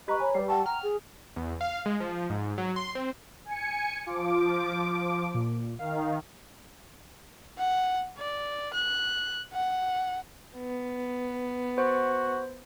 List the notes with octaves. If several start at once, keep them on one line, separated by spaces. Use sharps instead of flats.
G4 B4 D#5 A#5 C#6
C#5 G#5 A#5
G3 B4 C7
F#5 G5 A5 C#6
A#5 F6
G#4
E2
F5
G#3
F3
G#2
F#3
C6
C4
G#5 C#7
F3 F4 D6
A#2
D#3 F5
F#5
D5
F#6
F#5
B3
F#4 C5